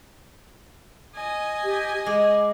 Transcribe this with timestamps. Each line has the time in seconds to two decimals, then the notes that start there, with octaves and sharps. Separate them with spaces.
1.15 D#5 G#5
1.64 G4
2.06 G#3 D6